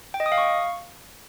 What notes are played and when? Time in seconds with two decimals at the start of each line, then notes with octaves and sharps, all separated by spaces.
0.14 G5
0.20 D#5
0.26 D#6
0.32 F5
0.38 C#6